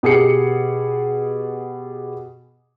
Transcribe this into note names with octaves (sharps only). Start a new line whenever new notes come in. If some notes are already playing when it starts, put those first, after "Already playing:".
B2 G4 G#4 G#5 C7 C#7